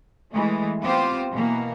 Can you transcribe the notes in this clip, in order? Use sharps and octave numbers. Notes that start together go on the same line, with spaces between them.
E3 G#3 A3
B3 C4 F4 G4 C5
B2 E3 A#3